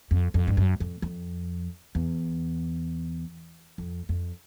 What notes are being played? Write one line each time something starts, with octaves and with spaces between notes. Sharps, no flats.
F2
F2
G2
F#2
F2
F2
E2
F2
F2